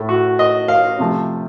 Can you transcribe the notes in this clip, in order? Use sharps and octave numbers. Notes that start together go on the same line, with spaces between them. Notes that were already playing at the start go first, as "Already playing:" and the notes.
Already playing: A2 A3
F#4
D#5
F5
C3 F3 A3